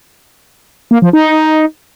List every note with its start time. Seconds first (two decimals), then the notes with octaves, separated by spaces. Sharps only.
0.91 A#3
1.02 F3
1.13 D#4